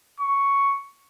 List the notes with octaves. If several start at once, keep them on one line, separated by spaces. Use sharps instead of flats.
C#6